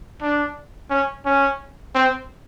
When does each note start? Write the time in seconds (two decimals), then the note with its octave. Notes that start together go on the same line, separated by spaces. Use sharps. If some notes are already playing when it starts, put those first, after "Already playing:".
0.22 D4
0.90 C#4
1.25 C#4
1.95 C4